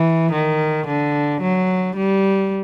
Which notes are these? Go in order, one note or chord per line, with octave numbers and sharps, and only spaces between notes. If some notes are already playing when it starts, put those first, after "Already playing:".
Already playing: E3
D#3
D3
F#3
G3